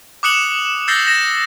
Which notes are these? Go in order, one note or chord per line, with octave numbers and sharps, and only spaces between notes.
D6 D#6 F#6 C#7 E7 F#7
E6 G6 A6 A#6 C7 G7
A#6 E7